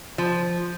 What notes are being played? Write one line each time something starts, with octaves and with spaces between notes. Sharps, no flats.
F3